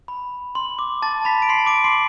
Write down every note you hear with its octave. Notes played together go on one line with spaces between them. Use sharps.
B5
C6
D6
A5 A6
B5 B6
D7
C6 C7
D6 D7
C6 C7